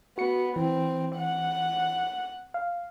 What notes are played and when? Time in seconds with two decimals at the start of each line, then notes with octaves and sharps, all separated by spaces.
0.18 B3 F#4 C#7
0.56 E3 C4
1.17 F#5
2.54 F5